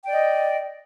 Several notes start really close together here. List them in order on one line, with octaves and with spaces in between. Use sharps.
G5 D5 D#5